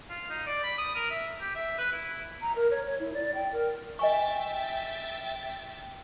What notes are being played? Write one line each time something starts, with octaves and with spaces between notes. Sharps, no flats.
F4
D#4
D5
B5
D#6
A#4
E5
G4
E5
B4
E4
A#5
A#4
C#5
C#5
E4
D5
G5
A#4
D#5 E5 G5 G#5 C#6 A6